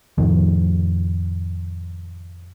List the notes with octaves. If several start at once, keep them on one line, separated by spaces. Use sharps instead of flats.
F2 A2 D#3 F3